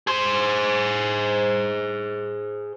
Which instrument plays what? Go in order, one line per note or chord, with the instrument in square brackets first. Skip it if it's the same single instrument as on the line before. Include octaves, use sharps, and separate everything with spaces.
[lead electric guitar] G#4 C5